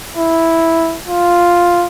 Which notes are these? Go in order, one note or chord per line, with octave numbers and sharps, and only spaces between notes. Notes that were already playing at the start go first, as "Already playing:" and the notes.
E4
F4